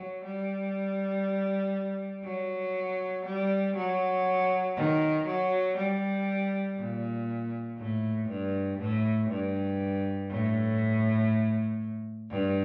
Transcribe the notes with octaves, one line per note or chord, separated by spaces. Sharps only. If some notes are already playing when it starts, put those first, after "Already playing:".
Already playing: F#3
G3
F#3
G3
F#3
D#3
F#3
G3
A#2
A2
G2
A2
G2
A2
G2